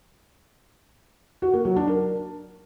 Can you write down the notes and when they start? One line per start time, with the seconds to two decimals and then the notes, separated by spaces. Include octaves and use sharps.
1.42 F#4
1.54 A#3
1.65 F#3
1.76 D4
1.88 A#4